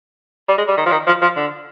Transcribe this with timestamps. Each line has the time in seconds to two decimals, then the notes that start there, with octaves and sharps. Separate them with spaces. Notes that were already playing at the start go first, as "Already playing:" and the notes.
0.48 G3
0.58 G#3
0.68 G3
0.77 D#3
0.86 F3
0.91 D#3
1.07 F3
1.22 F3
1.36 D3